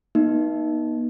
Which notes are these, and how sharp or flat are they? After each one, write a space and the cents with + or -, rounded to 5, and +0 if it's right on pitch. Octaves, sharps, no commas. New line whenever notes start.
B3 -45 D#4 +0